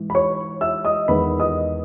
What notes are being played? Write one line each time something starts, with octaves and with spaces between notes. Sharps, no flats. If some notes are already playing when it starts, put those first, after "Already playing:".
Already playing: G#2 E3
B5
C#5 C#6
E5 E6
D#5 D#6
E2 D#3 G#3 B3 B4 B5
D#5 D#6